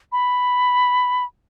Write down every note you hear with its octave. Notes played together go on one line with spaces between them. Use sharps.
B5